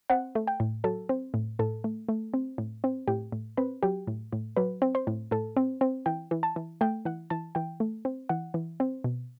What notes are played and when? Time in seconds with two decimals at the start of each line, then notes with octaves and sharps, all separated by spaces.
0.10 C4 F#5
0.35 A3
0.47 G5
0.60 A2
0.84 F#3 A4
1.09 C4
1.34 A2
1.59 A2 A4
1.84 A3
2.09 A3
2.34 C4
2.58 A2
2.84 C4
3.08 A2 G4
3.32 A2
3.57 C4 B4
3.83 F#3 G4
4.07 A2
4.33 A2
4.56 F#3 B4
4.82 C4
4.95 C5
5.07 A2
5.31 A2 A4
5.57 C4
5.81 C4
6.06 E3 G5
6.31 E3
6.43 A5
6.56 E3
6.81 A3 G5
7.05 E3 F#5
7.30 E3 A5
7.55 E3 G5
7.80 A3
8.05 C4
8.29 E3 F#5
8.54 E3
8.80 C4
9.04 B2